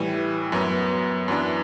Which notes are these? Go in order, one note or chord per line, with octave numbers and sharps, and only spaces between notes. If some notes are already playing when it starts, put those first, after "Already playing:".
Already playing: A2 E3 G3
F#2 F#3 B3
F#2 E3 B3 D4